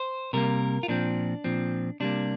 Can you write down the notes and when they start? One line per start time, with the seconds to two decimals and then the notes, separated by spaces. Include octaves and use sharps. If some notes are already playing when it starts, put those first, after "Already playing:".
Already playing: C5
0.33 C3 G3 A#3 A#4
0.83 F4
0.88 A#2 F3 C4 D4
1.44 A#2 F3 C4
2.00 C3 G3 A#3 D4